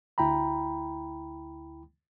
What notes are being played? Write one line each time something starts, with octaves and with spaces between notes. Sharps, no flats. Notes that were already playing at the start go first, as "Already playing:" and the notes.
D2 E4 G5 A#5 B5